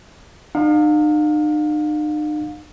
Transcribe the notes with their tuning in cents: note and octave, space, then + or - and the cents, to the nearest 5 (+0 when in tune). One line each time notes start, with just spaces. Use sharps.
D#4 -45 F5 +30